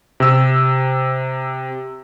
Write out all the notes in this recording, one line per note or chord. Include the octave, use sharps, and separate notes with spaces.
C3 E6